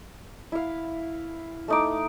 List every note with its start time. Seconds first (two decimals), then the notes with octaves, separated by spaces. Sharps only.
0.52 E4 F5
1.68 A3 D#4 D6